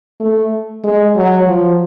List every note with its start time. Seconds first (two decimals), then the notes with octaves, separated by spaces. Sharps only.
0.20 A3
0.84 G#3
1.16 F#3
1.47 F3